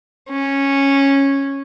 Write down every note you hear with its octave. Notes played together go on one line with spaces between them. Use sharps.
C#4